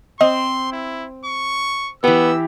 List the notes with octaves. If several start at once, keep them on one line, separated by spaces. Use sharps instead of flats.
C4 D#5 C6
E4
C#6
E3 B3 G4 E6